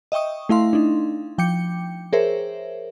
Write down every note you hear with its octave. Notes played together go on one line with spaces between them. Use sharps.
D#5 E5 G5 C#6 D#6
A3 E4 F5 C6
D4 D#4
F3 G5 D6 G6 C#7
G#4 A#4 C5 C#5 E5